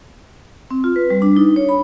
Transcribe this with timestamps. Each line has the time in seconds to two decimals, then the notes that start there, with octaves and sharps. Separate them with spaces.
0.71 C4
0.84 F4
0.96 B4
1.10 G3
1.22 D4
1.36 D#4
1.56 C#5
1.69 B5